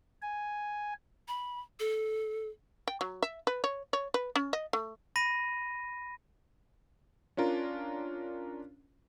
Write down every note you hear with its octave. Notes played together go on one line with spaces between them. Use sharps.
G#5
B5
A4
G5
F#3
E5
B4
C#5
C#5
B4
C#4
D#5
A3
B5 A#6 D#7
C#4 D4 F4 A#4